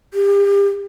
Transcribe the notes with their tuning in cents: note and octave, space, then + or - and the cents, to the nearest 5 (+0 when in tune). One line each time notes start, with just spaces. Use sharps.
G4 +35